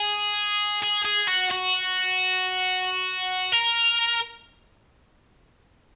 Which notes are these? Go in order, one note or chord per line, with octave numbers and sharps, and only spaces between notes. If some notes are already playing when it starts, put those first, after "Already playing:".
Already playing: G#4
G#4
G#4
F#4
F#4
A#4